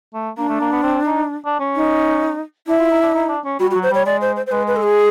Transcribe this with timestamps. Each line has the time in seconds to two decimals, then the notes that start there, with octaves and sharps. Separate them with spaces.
0.14 A3
0.38 A#3 D4
0.49 A3
0.60 A#3
0.72 B3
0.83 C4
1.06 D#4
1.45 D4
1.60 C#4
1.75 D#4
2.67 D4 E4
2.79 F4
2.91 D#4
3.02 D4
3.14 D#4
3.29 D4
3.45 C#4
3.59 G3 F#4
3.71 F#4
3.75 F#3
3.83 C5
3.91 G3 C#5
4.06 G#3 D5
4.21 C5
4.36 C5
4.47 C5
4.52 G#3 B4
4.67 B4
4.76 A4
4.83 G#4